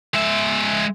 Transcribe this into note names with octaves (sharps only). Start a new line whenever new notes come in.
G#3 E5